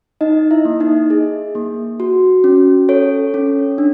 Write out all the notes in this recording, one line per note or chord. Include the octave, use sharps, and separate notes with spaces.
D#4 D#5
E4 E5
A#3
D#4 D#5
G#4
A#3
F#4
C#4
A4 C#5
C#4
D4